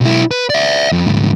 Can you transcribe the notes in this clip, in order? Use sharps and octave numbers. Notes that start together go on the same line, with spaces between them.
B1 E4
B4
D5 E5
F2
D2 G#2